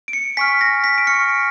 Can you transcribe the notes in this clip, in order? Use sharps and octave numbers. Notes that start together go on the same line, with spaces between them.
D7
C#7
G#5 C#6 F6 B6
A#6
B6
D7
G#5 C#6 F6 C#7